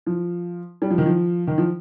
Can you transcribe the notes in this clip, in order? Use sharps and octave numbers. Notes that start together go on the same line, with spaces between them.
F3
G3
F3
D#3
F3
D#3
F3